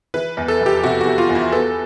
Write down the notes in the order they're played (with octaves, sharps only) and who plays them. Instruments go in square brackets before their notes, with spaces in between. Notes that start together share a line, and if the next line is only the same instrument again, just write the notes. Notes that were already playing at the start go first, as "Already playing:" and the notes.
[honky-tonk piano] E3 [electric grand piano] B4
[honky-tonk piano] E2
[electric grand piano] A4
[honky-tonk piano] F1
[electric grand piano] G4
[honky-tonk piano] C3 [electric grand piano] F#4
[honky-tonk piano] E3 [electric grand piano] F#4
[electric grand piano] F4
[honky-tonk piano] E2
[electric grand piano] E4
[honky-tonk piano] B3 [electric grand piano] A4